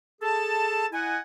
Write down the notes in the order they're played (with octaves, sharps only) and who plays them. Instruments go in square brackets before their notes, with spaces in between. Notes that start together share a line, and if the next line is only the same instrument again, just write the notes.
[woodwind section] G#4 A4 A5
E4 D#5 F#5 G#5